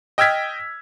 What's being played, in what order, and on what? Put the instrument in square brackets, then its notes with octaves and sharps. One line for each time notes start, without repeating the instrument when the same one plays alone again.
[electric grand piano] D#5 G5 E6 F6 G#6 B6